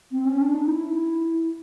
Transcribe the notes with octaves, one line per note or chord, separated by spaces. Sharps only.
C4
C#4
D4
D#4
E4